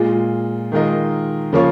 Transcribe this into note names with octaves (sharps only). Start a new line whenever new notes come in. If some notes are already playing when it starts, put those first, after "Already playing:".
Already playing: A#2 G#3 F4
D#3 G#3 F4 A#4 D#5
C#3 F3 A#3 F4 C#5